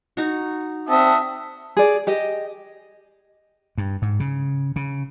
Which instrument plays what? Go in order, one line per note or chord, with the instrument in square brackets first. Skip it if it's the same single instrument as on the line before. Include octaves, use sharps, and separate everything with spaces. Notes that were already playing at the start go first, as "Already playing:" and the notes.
[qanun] D#4 F#4
[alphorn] C4 [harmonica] E5 F#5 D#6 [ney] A5
[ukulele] G#4 D5
G4 D#5
[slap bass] G2
G#2
C#3
C#3